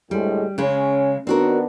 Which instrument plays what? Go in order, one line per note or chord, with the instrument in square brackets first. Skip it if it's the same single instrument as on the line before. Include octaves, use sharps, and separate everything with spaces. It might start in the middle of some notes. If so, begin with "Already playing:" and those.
[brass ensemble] D2 A2 G#3 [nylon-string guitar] G3
[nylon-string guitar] C#3 G#3 [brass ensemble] C#4
[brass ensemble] D#3 B3 D4 [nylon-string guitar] C4 F#4 A#4